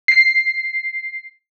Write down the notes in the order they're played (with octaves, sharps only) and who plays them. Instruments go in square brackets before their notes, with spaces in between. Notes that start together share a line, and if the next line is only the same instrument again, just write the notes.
[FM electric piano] C7